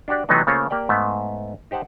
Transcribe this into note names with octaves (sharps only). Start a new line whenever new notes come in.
D4 F#4 G4 D5
C3 E3 F#3 A3 B3 D#4
C#3 A3 A#3 F4 C5 C#5
A#3 G4 D5 G5
G#2 A3 B3 E5
D#4 G4 C5 F#5 A5